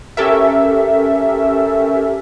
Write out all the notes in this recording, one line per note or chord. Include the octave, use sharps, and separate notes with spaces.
C#4 G4 A4 A#4 E5